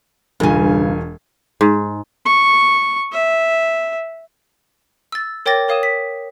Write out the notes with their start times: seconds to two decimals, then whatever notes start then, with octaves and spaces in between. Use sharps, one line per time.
0.40 E1 G2 C#3 F4 G#5
1.61 G#2
2.25 C#6
3.12 E5
5.12 E6 A6
5.46 A#4 C#5 G5 D6 A6 A#6
5.68 A#4 C#5 F5 D#6 D#7 E7
5.83 B6